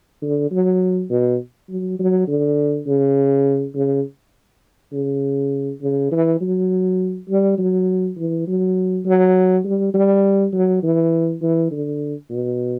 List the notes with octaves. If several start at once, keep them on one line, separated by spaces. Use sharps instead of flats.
D3
F#3
B2
F#3
F#3
D3
C#3
C#3
C#3
C#3
E3
F#3
G3
F#3
E3
F#3
F#3
G3
G3
F#3
E3
E3
D3
B2